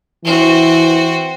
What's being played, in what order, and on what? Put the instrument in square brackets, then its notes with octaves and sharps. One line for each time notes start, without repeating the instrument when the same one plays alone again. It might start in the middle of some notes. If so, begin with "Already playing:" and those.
[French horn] E3 [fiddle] C4 F#4